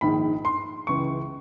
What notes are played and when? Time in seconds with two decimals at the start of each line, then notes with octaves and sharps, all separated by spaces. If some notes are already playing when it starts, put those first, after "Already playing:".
0.01 A#1 G#2 D#3 B5
0.45 C6
0.87 C#2 C#3 E3 C#6